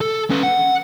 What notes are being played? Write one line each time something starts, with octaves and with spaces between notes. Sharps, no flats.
A4
C#4 B4
F#5